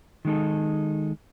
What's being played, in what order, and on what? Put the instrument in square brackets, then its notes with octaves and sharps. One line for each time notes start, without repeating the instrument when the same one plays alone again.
[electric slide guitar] D#3 G#3 D#4 A4